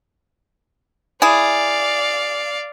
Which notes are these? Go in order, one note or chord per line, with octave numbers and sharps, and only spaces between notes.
E4 G#4 D5 F5